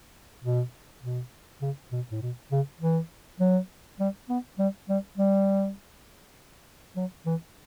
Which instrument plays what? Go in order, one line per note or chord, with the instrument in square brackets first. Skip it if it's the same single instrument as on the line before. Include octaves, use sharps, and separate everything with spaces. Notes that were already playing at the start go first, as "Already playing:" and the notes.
[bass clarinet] B2
B2
C#3
B2
A2
B2
C#3
E3
F#3
G3
B3
G3
G3
G3
F#3
E3